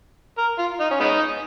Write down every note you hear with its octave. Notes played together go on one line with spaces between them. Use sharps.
A#4
F4
D#4
C#4
G#3 B3 D#4